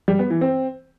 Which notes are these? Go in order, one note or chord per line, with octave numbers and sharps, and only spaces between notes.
G3
B3
E3
C4